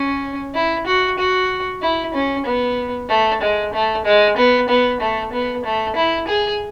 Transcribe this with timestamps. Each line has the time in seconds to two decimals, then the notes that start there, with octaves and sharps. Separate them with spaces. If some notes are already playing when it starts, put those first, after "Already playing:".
Already playing: C#4
0.55 E4
0.87 F#4
1.19 F#4
1.82 E4
2.14 C#4
2.46 B3
3.09 A3
3.41 G#3
3.73 A3
4.05 G#3
4.37 B3
4.69 B3
5.00 A3
5.33 B3
5.65 A3
5.96 E4
6.28 G#4